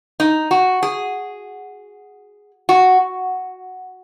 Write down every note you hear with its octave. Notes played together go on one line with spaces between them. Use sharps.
D#4
F#4
G#4
F#4